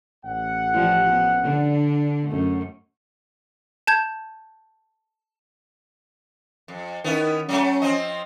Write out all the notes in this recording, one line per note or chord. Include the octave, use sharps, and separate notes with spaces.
A1 F#5
F3 G3
B3
D3 D4
F#2 A3
A5 G6 G#6
F2
D#3 B3 C#4 E4
F#3 G3 A3 C#4
F3 C4 D#5